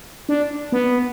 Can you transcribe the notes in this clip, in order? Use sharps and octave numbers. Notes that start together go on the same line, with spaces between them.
D4
B3